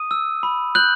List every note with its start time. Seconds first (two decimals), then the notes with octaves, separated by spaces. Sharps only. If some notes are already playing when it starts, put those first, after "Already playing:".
Already playing: D#6 D#7
0.11 E6
0.43 B5
0.75 F#6 G6 F#7